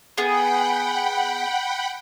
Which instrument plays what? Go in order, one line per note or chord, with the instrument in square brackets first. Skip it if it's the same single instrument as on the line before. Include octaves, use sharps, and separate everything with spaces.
[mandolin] B3 G#4 [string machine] F#5 G5 B5